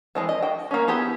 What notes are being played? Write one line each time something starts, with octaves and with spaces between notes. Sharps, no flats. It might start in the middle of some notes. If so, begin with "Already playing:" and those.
E3 G#3 C4
D#5
F#4 G5
A#3 C#4
B3 E4 G4 G#4